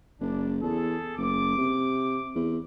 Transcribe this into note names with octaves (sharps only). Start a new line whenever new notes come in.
F#1 D4
E2 G#4 A4
F#1 D6
C3
E2